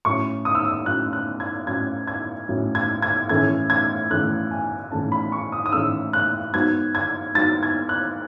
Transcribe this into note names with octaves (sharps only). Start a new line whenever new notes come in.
A2 F#3 C#4 C#6
D#6
E6
D#6
A2 F#3 C#4 F#6
F#6
G#6
A2 F#3 C#4 G#6
G#6
A2 F#3 C#4
G#6
G#6
A2 E3 A3 C#4 G#6
G#6
A2 E3 A3 C#4 F#6
G#5
A2 E3 A3 C#4 A5
B5
C#6
D#6
D#6
A2 E3 A3 C#4 E6
F#6
G#2 F#3 B3 G#6
G#6
G#2 F#3 B3 A6
G#6
F#6